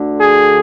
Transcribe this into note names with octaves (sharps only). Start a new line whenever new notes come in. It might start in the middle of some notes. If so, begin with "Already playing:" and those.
Already playing: D2 D3
G#4